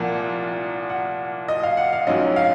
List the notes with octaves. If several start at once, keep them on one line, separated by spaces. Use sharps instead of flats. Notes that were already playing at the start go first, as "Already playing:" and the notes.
Already playing: C2 A#2 F3 A#3 F4 F#5
F#5
D#5
F5
F#5
F5
A#1 G#2 F#3 C#4 D#5
F5